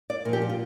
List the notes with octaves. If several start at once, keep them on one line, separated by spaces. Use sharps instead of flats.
D5
A#2 F3 G4 A#4
G4
F4